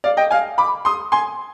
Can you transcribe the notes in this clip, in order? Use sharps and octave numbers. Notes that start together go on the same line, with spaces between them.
D5 F5
D#5 G5
F5 G#5
B5 D6
C6 D#6
G#5 C6